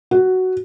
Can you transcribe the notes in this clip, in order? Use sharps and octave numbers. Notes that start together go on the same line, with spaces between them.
F#4